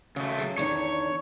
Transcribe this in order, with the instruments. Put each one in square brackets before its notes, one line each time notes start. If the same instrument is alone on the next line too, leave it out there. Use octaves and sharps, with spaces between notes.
[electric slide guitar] C#3 A3 [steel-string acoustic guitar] F#4
[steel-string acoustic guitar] F#3 G#4
[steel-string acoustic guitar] E2 D3 D#3 [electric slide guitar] C#5